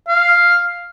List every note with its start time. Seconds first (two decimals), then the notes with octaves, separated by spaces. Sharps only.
0.08 F5